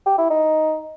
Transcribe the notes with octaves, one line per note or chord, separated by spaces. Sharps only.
G4
E4
D#4